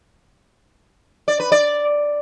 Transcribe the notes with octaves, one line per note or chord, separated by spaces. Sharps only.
D5
B4
D5